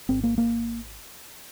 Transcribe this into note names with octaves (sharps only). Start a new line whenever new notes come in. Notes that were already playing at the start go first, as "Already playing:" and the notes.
G#1 G#2 C4
A#3
A#3